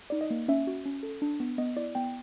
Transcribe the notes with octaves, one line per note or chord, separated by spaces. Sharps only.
D#4 D5
D#5
A#3
C#4 E5
F#4
C#4
A4
D4
B3
B3 D#5
E4 D5
B3 G5